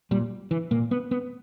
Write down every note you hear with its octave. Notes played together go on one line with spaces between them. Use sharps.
A#2 G3
E3
A#2 A#3
B3
B3